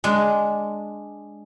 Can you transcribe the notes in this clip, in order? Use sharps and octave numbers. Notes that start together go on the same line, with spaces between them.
G#3 D4